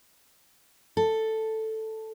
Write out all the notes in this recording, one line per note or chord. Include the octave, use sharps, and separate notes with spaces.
A4